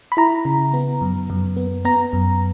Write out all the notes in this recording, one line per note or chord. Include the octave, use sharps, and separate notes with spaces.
B5
E4 A#5
C#3
B3
F#2
F#2
B3
B3 A#5
F#2